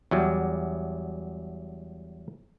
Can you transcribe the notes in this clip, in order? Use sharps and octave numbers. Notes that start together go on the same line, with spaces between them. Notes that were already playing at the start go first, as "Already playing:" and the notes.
E2 F#3 G3